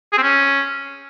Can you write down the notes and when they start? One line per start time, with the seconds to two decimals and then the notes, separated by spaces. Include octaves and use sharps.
0.12 G#4
0.17 C4
0.23 C#4